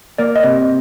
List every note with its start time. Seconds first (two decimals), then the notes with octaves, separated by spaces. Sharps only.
0.18 A#3 D5
0.36 D#5
0.44 C3